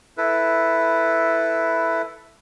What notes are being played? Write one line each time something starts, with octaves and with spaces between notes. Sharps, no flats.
E4 A4 B4